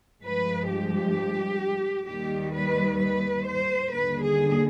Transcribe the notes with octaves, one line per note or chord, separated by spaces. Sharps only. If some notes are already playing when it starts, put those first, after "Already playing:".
G2 F3 G#3 B4
G4
D#2 D#3 G3 G4
B4
B4
C5
D#2 D3 G3 B4
G#4